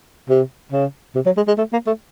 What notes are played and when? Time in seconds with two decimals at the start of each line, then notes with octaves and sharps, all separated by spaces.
0.29 C3
0.72 C#3
1.15 C3
1.26 F#3
1.36 G#3
1.47 G#3
1.58 A3
1.72 A#3
1.87 A3